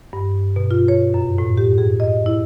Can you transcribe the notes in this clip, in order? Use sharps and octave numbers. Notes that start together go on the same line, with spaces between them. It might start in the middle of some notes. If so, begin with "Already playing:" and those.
G2
B2
F4
C#5
F#2
A2
G4
G#4
D#5
E4